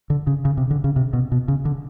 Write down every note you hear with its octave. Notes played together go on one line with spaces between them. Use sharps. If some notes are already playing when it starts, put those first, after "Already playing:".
D3
C#3
C#3
C3
D3
C#3
C3
B2
B2
C#3
D3